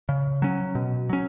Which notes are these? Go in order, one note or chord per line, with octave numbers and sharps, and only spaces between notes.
C#3
F#3 C#4
B2
F#3 C#4